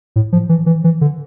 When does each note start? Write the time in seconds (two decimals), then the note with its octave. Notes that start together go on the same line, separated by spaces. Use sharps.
0.16 A2
0.33 F3
0.49 E3
0.66 E3
0.84 E3
1.01 D3